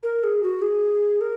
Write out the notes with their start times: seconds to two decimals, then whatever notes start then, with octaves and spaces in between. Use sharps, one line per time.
0.03 A#4
0.24 G#4
0.43 F#4
0.62 G#4
1.21 A#4